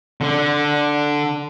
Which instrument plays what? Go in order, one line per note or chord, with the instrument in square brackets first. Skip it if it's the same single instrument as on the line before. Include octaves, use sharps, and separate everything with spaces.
[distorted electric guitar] D3